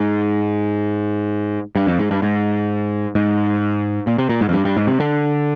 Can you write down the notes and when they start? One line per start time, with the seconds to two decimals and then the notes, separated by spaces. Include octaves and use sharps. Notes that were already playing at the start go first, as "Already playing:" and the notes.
Already playing: G#2
1.75 G2
1.87 F2
1.99 G#2
2.11 G2
2.22 G#2
3.15 G#2
4.07 A#2
4.18 C3
4.29 A#2
4.41 G#2
4.49 F2
4.53 G2
4.65 G2
4.77 G#2
4.87 C3
5.00 D3